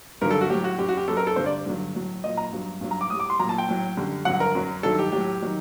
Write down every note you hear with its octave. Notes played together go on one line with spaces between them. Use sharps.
G2 D3 F#3 A#4
A4
F#4
A2 F#3 G4
F#4
F#2 F#3 G4
F#4
G4
F#2 F#3 A4
A#4
A4
G2 D3 G3 C5
D5
G2 D3 F#3
A2 F#3
A#2 F#3 D#5
A#5
G2 F#3
G2 F#3
A#5
D6
A2 G3 D#6
D6
C6
A#2 F#3 A#5
A5
G5
A2 F#3
F#2 D3 G3
G2 D3 F#3 F#5
A#4
F#2 F#3
G2 D#3 F#3 A4
G4
A2 F#3 G4
D#3 F#3